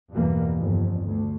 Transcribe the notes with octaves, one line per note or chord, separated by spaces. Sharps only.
E2 G2 B2 E3 G3 A#3
G1 F2
D2